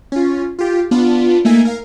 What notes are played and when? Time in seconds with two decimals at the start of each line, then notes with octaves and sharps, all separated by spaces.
0.12 C#4 F4
0.59 F4 G4
0.91 B3 D4 F4
1.45 A3 A#3 D#4 E5 G#5
1.65 A#4 F5